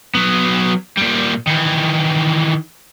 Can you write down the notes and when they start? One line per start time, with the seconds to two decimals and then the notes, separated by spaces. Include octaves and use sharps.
0.15 F#3 B3
0.98 A#2 G3
1.47 D#3 E3